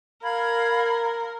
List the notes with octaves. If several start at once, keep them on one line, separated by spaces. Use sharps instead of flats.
A#4 F5 B5 G#6